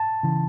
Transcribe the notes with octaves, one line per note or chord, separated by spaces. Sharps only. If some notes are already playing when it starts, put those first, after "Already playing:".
Already playing: A5
C#3 E3